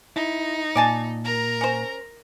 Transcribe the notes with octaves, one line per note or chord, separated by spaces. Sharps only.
D#4 E4
A#2 D5 G#5 A5
A#4 A#5
C#4 C5